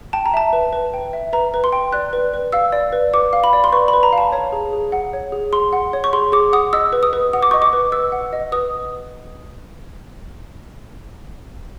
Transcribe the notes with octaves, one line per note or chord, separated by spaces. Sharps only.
G5 A5
A#5
E5 A5
B4
B4
G5
E5
B4 A#5
B4
C6
G5
D5 F#6
B4
B4
F5 E6
D5
B4
B4 D6
F5
B5
D5
C6
B4 C#6
B5
B4
A#5
F5
A5
C#5 A#5
G#4
G#4
F#5
C#5
G#4
G#4 C6
F#5
C#5
C#6
G#4 C6
G#4 D6
F#5 D#6
D#5 E6
B4
D#6
B4
F#5 D#6
D6
D#5 C#6
D6
B4
B4 E6
F#5
D#5
B4 D#6